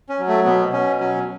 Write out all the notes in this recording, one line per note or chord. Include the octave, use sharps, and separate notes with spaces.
C#4
F#3
A3
B2 B3
B2 C#4
F#3 C#4